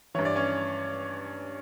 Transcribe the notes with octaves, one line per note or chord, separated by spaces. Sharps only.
G2 E3 C#5
D5
C#4 C#5